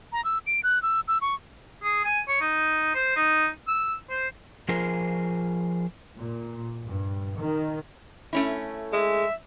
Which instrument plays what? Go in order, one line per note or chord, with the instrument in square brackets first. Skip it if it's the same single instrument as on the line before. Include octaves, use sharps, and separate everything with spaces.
[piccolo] A#5
E6
D7
F#6
E6
E6
C#6
[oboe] G#4
G#5
C#5
D#4
C5
D#4
E6
C5
[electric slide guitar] F3 F4 G#4 A#4 C5
[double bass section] A#2
G2
D#3
[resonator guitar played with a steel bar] A3 C#4 E4
[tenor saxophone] G#3 [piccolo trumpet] E5